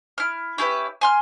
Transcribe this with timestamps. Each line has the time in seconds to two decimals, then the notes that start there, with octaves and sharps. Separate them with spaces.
0.18 E4 F6
0.58 C#4 E4 G4 B4
1.01 G#5 C6 F6